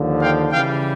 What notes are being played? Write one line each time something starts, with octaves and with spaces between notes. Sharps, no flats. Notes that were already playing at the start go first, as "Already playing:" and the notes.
Already playing: D#2 D3 F3
F5 G5
C#3 E3 G3 F5 G5